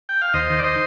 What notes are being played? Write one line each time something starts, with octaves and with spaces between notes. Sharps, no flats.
G5
F5
D#2 C5 D#5
D#3
D5
C5 D#5